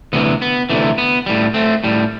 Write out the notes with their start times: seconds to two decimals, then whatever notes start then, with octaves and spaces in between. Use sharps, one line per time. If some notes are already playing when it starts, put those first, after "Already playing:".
0.13 D2 C3 E3 B3
0.42 B3
0.70 D2 C3 E3 A3
0.98 B3
1.26 A2 G3
1.54 A3 C4
1.84 A2 G3